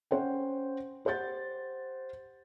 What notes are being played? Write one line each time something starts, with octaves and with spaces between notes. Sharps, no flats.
C#4 C5 F#5 G5
G4 C5 F#5 G6 A6